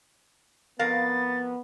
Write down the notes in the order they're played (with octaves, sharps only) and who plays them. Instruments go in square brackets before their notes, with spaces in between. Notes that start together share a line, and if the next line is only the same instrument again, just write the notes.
[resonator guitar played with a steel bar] F2 A#4 F5 [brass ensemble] B3 [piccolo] A6